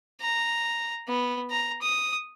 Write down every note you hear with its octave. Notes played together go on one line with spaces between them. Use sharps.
A#5
B3
A#5
D#6